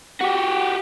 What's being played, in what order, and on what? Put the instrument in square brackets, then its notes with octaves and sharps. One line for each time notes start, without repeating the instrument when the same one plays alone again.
[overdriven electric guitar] F#4 G4